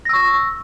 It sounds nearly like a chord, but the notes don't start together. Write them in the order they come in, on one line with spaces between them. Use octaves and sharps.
A#6 E6 C#6